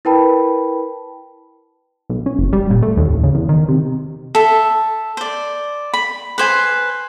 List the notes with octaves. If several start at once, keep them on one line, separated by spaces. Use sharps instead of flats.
E4 A#4 B4 G5 A5 B5
B1
C#4
F#1
G3
A#2
A3
D#2
A1
C#3
E2
D#3
C3
A4 E5
C5 D5
B5
B4 C5 G#5